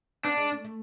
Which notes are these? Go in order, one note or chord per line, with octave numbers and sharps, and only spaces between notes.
B3 D4
G#3
A3
A3